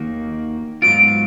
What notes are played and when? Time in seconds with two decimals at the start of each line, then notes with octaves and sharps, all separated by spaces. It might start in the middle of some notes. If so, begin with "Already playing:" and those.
Already playing: D#2 D#3 A#3 D#4 F#4
0.82 G#2 F#3 B3 F4 D7